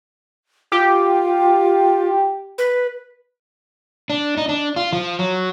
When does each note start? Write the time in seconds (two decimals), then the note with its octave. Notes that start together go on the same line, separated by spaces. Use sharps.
0.72 F4 G4
2.58 B4
4.10 D4
4.37 D#4
4.49 D4
4.76 F4
4.93 F3
5.19 F#3